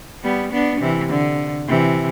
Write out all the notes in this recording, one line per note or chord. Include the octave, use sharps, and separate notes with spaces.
G3 B3
B3 D4
C3 E3
D3
C3 E3